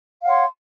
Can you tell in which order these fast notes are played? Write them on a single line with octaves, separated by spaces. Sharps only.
F5 F#5 C#5 C6